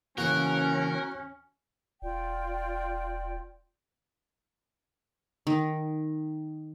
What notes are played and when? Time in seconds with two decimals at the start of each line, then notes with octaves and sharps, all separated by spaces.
0.18 C#3 E3 A#3 C#4 F#4 A#4 F#5
2.02 E1 F4 D5 G5
5.47 D#3